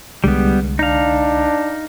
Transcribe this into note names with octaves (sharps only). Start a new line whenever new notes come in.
C2 D3 G3 G#3 B3
D4 D#4 F5